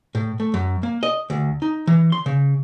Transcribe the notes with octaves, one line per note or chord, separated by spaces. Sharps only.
A2
A3
F#2
A#3
D#5
D2
D#4
E3
C6
C#3